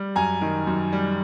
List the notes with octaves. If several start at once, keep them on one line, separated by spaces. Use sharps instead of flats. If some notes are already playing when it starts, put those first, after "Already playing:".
Already playing: G3
F#2 G#5 A#5
D#3
F#2
G3